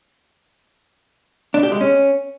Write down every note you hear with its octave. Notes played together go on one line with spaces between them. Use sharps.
D4
G4
G#3
C#4